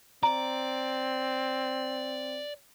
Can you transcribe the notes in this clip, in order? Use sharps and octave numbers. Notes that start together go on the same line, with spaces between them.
C4 D5 A#5